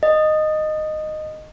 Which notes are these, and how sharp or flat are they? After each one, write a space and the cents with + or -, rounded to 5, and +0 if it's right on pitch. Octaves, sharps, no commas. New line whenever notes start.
D#5 -10